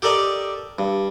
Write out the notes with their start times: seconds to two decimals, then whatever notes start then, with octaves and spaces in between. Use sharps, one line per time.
0.02 G4 A4 A#4 D5 D#5
0.79 G2